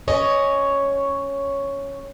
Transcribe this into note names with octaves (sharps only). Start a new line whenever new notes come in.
C#4 C#5 D#5